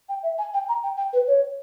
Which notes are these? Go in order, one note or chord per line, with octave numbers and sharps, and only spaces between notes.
G5
E5
G#5
G5
A#5
G5
G5
B4
C#5